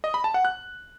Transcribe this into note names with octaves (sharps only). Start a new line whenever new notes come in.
D#5
B5
A5
F#5
F#6